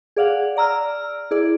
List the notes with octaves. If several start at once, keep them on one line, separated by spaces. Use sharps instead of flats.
G#4 D5 F5 F#5
D5 A#5 E6 F6
E4 G#4 D5